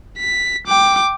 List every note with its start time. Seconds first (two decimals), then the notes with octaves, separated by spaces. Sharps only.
0.18 B6
0.66 G5 D6